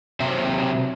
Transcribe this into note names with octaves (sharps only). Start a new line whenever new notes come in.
C3 F#3 E5